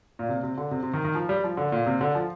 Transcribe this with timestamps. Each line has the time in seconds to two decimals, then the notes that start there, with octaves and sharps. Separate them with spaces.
0.19 A#2
0.29 C3
0.43 C3
0.58 D3
0.71 C3
0.83 C3
0.93 D#3
1.04 D#3
1.15 F3
1.29 G3
1.44 F3
1.57 D3
1.72 A#2
1.86 C3
2.01 D3
2.15 F3